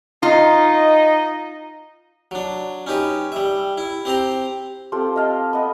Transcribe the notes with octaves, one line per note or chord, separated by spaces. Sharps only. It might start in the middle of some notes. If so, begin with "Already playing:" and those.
D#4 F4 D#5
F#3 D4
C#4 D#4 G4 B4
G3 E5
E4
C4 G4 C5 A#5
C4 F4 G4 A4
D#5 F5 A5
B3 D#5